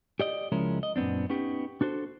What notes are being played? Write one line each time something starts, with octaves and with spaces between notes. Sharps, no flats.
G4 D5 D#5
C#2 F3 G#3 C#4 E4 A#4
D#5
F#2 A#2 B3 C4 D4
B3 C#4 D#4 G4
D4 F#4 A4 C5